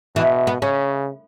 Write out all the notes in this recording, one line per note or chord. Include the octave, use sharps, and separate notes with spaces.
B2 E3
B3
C#3 C#4